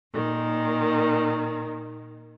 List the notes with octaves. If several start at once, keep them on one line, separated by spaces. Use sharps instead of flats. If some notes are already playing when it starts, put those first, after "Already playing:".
A#2 D#3